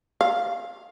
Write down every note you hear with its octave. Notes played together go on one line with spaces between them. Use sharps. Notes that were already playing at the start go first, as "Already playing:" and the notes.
F5